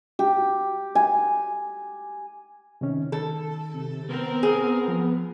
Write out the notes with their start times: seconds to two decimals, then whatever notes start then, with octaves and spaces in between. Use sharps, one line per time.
0.19 G4
0.95 G#5
2.81 C3 D#3 C#4
3.12 D#3 A4
3.74 C3
4.09 B3 C4 A#4
4.43 G#4
4.88 F3